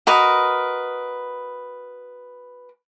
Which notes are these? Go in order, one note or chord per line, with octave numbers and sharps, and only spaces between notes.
F#4 A#4 B4 D#5